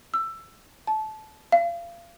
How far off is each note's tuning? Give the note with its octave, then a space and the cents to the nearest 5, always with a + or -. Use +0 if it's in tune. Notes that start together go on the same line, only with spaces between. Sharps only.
E6 +15
A5 -20
F5 -30